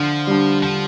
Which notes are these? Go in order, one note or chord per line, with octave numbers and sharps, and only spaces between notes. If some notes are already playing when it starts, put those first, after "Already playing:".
Already playing: D3 F3
G3 D4
D3 F3